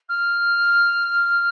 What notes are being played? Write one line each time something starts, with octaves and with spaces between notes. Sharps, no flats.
F6